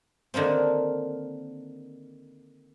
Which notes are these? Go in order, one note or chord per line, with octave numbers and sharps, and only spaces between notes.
D3 D#3 A#3 C4